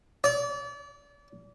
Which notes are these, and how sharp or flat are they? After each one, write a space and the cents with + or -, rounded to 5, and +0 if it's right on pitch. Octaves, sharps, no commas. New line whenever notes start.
D5 -35